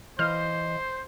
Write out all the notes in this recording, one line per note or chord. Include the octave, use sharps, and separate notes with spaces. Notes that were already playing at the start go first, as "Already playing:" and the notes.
E3 C5 D#5 F5 F6